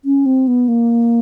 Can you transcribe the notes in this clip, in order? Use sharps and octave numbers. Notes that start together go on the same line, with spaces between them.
C#4
C4
B3
A#3